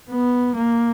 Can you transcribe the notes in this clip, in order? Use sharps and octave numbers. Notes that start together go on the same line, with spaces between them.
B3
A#3